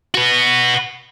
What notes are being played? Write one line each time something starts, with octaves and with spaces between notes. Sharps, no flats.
F#4 B4